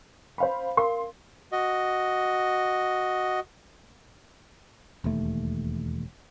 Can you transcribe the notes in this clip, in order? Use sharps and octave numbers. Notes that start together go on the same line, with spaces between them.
C5 F5 B5
A#4 F5 C6
F#4 D#5
E1 D#2 A3